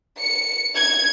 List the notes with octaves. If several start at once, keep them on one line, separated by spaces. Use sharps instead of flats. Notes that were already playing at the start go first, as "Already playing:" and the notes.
C#7
G#6